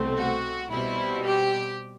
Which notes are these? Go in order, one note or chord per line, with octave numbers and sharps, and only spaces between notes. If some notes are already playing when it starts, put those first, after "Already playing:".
Already playing: C2 B2 A3 C4
F#4
B2 G3 C4 E4
G4